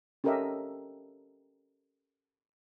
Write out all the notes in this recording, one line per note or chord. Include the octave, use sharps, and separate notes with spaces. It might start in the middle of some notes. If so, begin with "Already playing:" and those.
C#4 G4 A4 A#4 D#5 E5